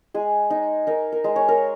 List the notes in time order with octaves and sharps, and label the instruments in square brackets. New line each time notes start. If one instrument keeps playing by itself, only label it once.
[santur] G#3 G#4
D#4
D#4 A#4
A#4
G#3
C#5
A#4